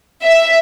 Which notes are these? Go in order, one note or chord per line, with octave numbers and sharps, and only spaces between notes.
E5